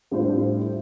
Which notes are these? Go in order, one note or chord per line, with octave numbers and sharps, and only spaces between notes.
A2 G3 D4 F4 C5